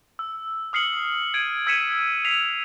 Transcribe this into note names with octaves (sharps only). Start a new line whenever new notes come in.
E6
D#6 F6 C7 C#7 F#7
G#6 D7 D#7
E6 G#6 B6 C#7 D#7 E7
B6 C7 F7